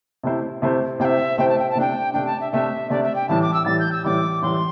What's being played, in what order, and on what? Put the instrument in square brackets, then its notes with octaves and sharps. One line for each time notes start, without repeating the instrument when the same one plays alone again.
[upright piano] C3 A3 C4 E4 C5
C3 A3 C4 E4 C5
[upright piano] C3 A3 C4 E4 C5 [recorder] E5 G5
[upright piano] C3 A3 C4 E4 C5 [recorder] G5
[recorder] A5
G5
A5
[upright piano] C3 A3 D4 [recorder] G5
[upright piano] C3 A3 D4 [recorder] G5
[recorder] A5
E5
[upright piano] C3 A3 D4 [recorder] E5
[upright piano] C3 A3 D4 [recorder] D5
[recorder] E5
G5
[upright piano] A2 E3 G3 [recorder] A5
[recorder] D6
E6
[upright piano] A2 E3 G3 [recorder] A6
[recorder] G6
E6
[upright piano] A2 E3 G3 [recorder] D6
[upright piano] A2 E3 G3 [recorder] C6